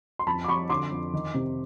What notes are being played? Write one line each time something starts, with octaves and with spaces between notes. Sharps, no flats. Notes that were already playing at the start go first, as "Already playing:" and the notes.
C6
F2 A5 B5
D6
F2 B5 C#6
D3 C6 D6
F2
D#3
C3